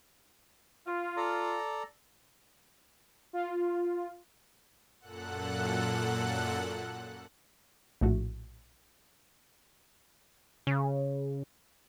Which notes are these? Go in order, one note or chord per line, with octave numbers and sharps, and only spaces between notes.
F4
A4 D5 A#5
F4
F#2 A#2 A4 F#5 F#6
A#1 A2 A3 F#4
C#3